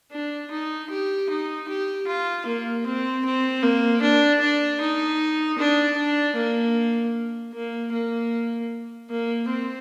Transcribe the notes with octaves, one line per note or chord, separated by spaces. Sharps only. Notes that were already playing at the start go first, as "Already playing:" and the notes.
D4
D#4
G4
D#4
G4
F4
A#3
C4
C4
A#3
D4
D4
D#4
D4
D4
A#3
A#3
A#3
A#3
C4